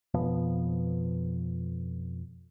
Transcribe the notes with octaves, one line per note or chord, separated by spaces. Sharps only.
F2 B2 F3 B3